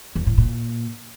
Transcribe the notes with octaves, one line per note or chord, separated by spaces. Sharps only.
E2
A2
A#2